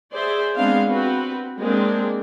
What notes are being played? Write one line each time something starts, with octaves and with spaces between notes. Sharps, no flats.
G#4 C5 D5 E5
G#3 B3 C4 D4 F5
C4 F#4 B4
G#3 A#3 C4 D4